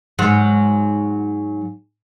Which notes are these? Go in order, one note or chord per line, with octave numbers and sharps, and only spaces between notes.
G#2 F#3